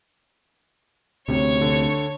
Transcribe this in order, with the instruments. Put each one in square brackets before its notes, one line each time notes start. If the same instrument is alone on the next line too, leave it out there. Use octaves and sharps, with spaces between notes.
[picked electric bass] D2 C3 [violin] C#5 C#6
[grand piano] D3